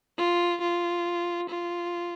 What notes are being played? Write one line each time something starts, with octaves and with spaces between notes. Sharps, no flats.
F4
F4
F4